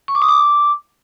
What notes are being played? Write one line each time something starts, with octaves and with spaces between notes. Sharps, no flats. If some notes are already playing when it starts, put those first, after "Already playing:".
C#6
D6
D#6
D6